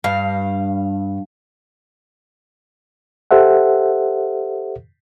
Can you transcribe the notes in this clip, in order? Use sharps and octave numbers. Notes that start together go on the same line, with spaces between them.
G2 F5
G4 A4 C5 E5 F#5